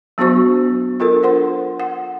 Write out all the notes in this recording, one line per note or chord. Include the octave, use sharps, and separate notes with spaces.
F#3 B3 D4 F#4 C5 C#6
D4 F4 A4 A#4
C5 F#5 C6
F#5